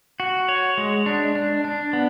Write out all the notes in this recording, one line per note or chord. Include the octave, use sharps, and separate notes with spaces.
F#4
C#5
G#3
D4
D4
D4
B3